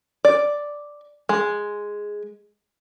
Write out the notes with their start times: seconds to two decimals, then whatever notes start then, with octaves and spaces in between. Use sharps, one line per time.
0.25 D5
1.29 G#3